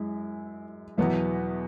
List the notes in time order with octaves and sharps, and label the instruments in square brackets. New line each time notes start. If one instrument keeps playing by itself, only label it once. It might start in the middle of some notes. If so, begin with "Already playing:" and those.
Already playing: [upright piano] F#2 E4 [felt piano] G#3
[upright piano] E2 B2 B3 E4 [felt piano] F#3